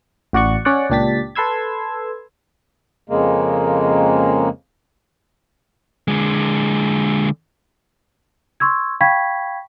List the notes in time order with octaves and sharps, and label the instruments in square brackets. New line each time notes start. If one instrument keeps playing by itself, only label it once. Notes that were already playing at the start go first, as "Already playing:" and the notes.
[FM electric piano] A1 F#4 D5 F#5 C#6
C#4 C#5 D5 F#5
C#2 A#2 D4 G4 A6 B6
A4 B4 C6 E6 G#6
[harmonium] F2 C#3 G#3 A#3
[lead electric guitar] D3 G#3
[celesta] C6 C#6 E6 G#6
F5 G5 B5 C#6 G#6 B6